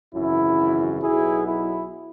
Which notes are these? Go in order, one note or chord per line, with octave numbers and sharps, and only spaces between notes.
G#1 F#2 C#3 E3 E4
B1 B2 F#3 B3 E4 G#4
E4